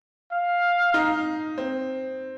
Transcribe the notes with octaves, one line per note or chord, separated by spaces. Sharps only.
F5
D#4
C4